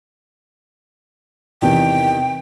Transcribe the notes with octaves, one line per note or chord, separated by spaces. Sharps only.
E2 C3 D#3 G5